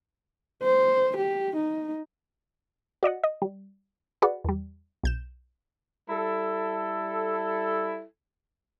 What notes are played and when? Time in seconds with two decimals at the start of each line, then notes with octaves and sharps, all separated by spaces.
0.63 C5
1.17 G4
1.56 D#4
3.03 F#4 D5 D#5 F#5
3.24 D#5
3.42 G3
4.22 F#4 G#4 B4 D5 F#5
4.44 E2 G3
5.04 B1 G6 E7
6.09 G3 E4 A4